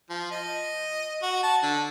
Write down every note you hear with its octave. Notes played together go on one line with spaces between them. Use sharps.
F3
D#5
F#4
A5
D3